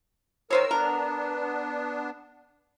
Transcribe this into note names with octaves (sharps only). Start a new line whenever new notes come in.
D#3 A#4 C5 C#5 E6
B3 D4 A#4